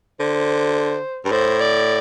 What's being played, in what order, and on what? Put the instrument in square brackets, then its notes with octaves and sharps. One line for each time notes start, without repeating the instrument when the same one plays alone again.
[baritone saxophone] D3 [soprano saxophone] C5
[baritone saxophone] G2
[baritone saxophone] A2 [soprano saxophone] C5
[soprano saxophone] D5